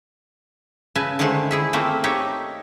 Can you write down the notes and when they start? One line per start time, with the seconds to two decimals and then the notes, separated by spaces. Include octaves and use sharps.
0.95 C#3 B4 E5 G#5 A5
1.19 D3 D#3 G#3 A3 C5
1.51 E4 G#4 E5
1.73 A3 A#3 C4 F4 E5
2.04 D#4 G4 C#5 E5